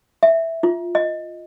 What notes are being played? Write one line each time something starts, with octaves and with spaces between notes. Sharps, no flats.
E5
F4
D#5